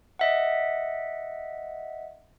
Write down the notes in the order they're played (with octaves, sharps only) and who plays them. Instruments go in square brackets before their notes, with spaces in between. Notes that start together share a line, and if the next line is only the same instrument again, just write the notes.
[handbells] D#5 E5 F#5